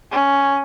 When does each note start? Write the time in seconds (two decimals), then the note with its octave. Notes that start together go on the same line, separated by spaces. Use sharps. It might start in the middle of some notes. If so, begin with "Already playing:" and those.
0.12 C#4